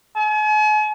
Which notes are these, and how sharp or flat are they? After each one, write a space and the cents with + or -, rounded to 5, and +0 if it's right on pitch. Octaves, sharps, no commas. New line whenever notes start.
G#5 +45